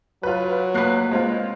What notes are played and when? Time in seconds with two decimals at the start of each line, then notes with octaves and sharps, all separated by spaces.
0.23 F#3 F4 B4
0.74 F1 A#3 B4 F#6 C7
1.11 G#3 C4 F4